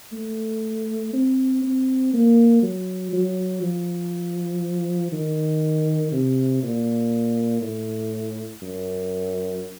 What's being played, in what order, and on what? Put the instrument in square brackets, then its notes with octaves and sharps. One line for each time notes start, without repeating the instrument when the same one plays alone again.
[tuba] A3
C4
C4
A#3
F#3
F#3
F3
D#3
C3
A#2
A2
F#2